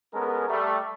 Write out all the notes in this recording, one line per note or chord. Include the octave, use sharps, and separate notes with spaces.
G#3 B3 C#4 A4 A#4
G3 A3